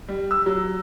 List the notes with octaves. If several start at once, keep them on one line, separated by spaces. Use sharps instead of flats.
G3
E6
F#3